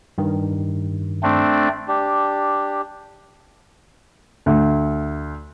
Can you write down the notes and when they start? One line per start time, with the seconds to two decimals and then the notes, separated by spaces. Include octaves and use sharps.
0.18 G2 D#3
1.23 A3 C4 D4
1.88 D4 G4
4.46 D2